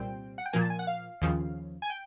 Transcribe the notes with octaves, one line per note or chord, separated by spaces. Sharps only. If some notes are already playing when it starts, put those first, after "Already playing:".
Already playing: C2 A#2 G3 C4 G5
F#5
G5
A#2 F3 A#3 G#5
A5
G#5
F#5
F5
D#2 C#3 F3
G#5
G5